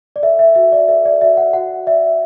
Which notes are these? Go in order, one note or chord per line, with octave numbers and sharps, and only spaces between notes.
D5
A4 E5
E5
F#4 E5
D5
A4 E5
D5
F#4 E5
F#5
F#4 F#5
D5 E5